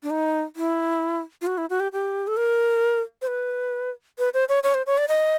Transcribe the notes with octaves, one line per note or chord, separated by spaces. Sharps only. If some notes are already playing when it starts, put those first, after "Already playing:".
D4
D#4
E4
F4
F#4
E4
F#4
G4
G4
A4
A#4
C5
B4
B4
C5
C#5
C#5
C5
C#5
D5
D#5